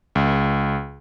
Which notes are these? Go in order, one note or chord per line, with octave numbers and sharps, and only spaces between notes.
C#2